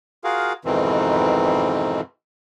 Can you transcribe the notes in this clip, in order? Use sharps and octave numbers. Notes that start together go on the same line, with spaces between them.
F4 F#4 G#4 A#4 F5
F2 G#2 B2 D#3 E3 C4